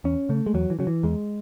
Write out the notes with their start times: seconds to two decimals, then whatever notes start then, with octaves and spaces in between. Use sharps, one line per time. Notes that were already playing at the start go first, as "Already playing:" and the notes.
0.04 E2 C#4
0.29 C#3 A3
0.46 G#3
0.54 E2 F#3
0.70 E3
0.79 C#3 F#3
0.87 E3
1.03 E2 G#3